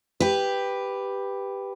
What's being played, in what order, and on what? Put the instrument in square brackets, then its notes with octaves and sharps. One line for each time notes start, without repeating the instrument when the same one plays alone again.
[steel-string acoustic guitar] G4 B4